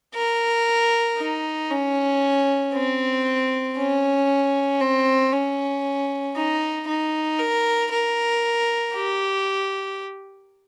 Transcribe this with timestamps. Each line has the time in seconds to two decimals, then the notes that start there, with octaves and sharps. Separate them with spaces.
0.15 A#4
1.18 D#4
1.70 C#4
2.74 C4
3.77 C#4
4.81 C4
5.32 C#4
6.36 D#4
6.87 D#4
7.39 A#4
7.91 A#4
8.94 G4